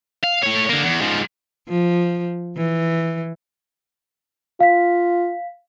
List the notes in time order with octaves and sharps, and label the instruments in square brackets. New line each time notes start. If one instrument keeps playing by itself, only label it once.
[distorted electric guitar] F5
A3 C#5
D3 A#3
E2
G#2 F3
[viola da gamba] F3
E3
[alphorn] F4 [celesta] F5 B6